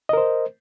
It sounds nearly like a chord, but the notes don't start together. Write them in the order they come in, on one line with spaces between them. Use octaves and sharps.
D#5 A#4 C5